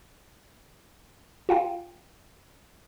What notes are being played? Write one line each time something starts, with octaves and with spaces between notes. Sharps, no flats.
F4 F5 G5